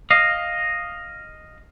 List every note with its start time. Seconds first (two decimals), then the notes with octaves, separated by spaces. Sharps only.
0.11 D#5 F5